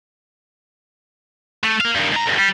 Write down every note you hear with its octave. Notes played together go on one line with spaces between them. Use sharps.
A3
A#3 F5
G2 D#3
G#2 A#5
D2 G2
G3